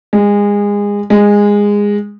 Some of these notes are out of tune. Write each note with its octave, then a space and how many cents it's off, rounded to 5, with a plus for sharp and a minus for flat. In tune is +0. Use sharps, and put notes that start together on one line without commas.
G#3 -25
G#3 -15